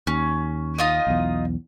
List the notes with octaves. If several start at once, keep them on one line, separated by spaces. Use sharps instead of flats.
D#2 C#4
D#4 F4 D#5
B1 E2